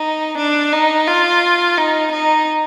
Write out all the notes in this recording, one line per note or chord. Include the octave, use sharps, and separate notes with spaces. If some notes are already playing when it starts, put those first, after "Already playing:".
Already playing: D#4
D4
D#4
F4
D#4
D#4